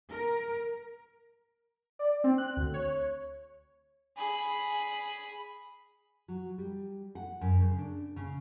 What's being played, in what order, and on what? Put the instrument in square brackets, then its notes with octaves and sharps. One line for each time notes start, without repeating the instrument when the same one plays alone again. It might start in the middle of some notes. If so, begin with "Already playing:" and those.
[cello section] A#4
[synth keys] D5
C4
F#6
D2
C#5
[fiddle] G#4 B5
[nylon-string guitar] F#3
G3
F#5
F#2
C#3
D4
C#3